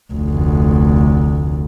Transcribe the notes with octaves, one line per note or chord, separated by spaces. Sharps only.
F1 D2